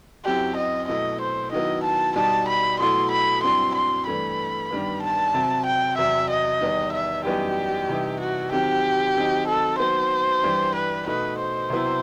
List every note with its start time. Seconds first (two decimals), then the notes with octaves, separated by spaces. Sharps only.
0.25 F#2 F#3 C4 E4 G4
0.56 D#5
0.88 B2 F#3 A3 E4 D#5
1.21 C5
1.52 D#3 F#3 B3 E4 D#5
1.84 A5
2.16 B2 G3 D#4 A5
2.48 B5
2.80 B2 F#3 A3 E4 C6
3.11 B5
3.43 G2 F#3 C4 E4 C6
3.75 C6
4.06 G2 E3 A3 B5
4.70 G2 D#3 G3 B3
5.03 A5
5.34 C3 F#3 C4
5.66 G5
5.97 E2 C3 F#3 E5
6.30 D#5
6.61 E2 D#3 G3 B3 D#4
6.93 E5
7.25 F#2 E3 G3 B3 D#4 G4
7.89 C3 E3 G3 D#4
8.20 F#4
8.52 D#3 F#3 C4 G4
9.16 D#3 F#3 C4 D#4
9.48 A4
9.79 D#3 F#3 B3 C5
10.43 G2 E3 G3
10.75 B4
11.06 B2 A3 D#4 B4
11.38 C5
11.70 C3 F#3 B3 E4